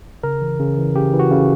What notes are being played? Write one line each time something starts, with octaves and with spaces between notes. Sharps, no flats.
C#3 A#4
E3
C#3
E3
C#3 G4
E3
F#4
C#3